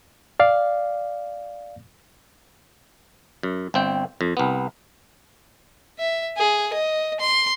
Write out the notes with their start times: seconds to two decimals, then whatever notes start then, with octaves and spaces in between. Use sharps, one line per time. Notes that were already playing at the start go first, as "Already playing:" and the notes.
0.40 D5 F5
3.43 F#2
3.74 G1 C4 G5
4.21 F2
4.37 C2 B3
5.99 E5
6.37 G#4
6.73 D#5
7.20 C6